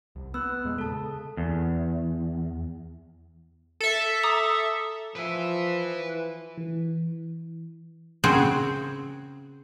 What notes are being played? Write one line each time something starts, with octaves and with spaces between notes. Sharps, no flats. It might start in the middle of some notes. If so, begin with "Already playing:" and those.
C2
B3 E6 F#6
E2 A#2 G#3
C#3 A4 A5
E2
A4 E5
A#5 D6 D#6
F3 B4 E5
E3
E3
C#3 C4 F#4 G#4